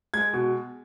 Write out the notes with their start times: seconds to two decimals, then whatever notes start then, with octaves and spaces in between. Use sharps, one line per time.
0.14 G#3 G#6
0.33 B2